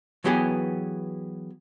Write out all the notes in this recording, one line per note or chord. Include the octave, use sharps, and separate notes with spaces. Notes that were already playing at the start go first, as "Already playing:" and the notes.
E3 F#3 B3 G4 G#4